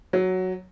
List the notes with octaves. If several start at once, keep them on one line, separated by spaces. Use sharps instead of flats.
F#3